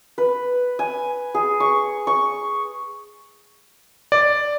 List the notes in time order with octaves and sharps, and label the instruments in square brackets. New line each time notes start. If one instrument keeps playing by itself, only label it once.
[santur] B4
G#5
G#4
C#6
C#6
[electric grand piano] D5